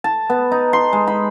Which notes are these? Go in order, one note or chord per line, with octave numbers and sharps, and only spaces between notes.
A5
B3
D#4
C6
G#3
B5